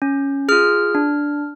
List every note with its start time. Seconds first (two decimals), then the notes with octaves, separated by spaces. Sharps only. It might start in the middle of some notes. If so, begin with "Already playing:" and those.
0.02 C#4
0.49 F4 G#4 F6
0.95 D4